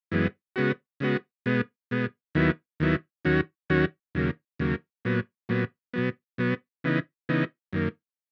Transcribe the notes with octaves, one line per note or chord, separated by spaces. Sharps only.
F#2 E3 G#3 B3
C#3 G#3 B3 F#4
C#3 G#3 B3 F#4
B2 G#3 B3
B2 G#3 B3
D#2 D#3 F#3 B3 E4
D#2 D#3 F#3 B3 E4
D#2 D#3 F#3 C#4 F#4
D#2 D#3 F#3 C#4 F#4
D#2 C#3 F#3 A#3
D#2 C#3 F#3 A#3
A#2 F#3 B3
A#2 F#3 B3
B2 F#3 B3
B2 F#3 B3
C#3 E3 B3 D#4
C#3 E3 B3 D#4
F#2 D#3 A#3